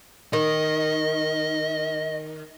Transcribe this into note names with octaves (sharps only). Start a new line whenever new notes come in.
D#3 D#5